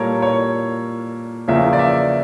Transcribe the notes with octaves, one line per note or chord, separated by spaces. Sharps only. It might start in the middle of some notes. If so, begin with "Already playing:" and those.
Already playing: A#2 G3 A#3 A4 A#4 C#5
C#5
E2 C#3 F3 A#3 E5
D5
E5